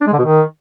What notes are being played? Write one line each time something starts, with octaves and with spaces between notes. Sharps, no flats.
D4
G#3
D3
B2
D#3